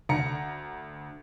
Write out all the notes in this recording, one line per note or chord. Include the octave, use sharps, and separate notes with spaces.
D2 A#5 C#7